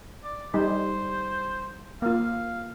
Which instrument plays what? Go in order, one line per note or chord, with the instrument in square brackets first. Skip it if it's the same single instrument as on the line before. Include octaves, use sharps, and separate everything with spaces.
[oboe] D5
[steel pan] G3 D#4 [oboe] C5
[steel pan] A#3 F4 [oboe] F5